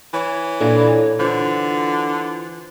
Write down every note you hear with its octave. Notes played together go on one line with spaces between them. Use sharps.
E3 C#5
A#2 D4 E4 A4
D3 E3 F4 C5